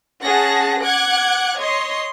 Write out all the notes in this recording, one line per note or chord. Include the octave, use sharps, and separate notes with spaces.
C#4 G#4 F#5 A5 A#6
F#5 D6 F#6 G#6
C#5 D#5 C6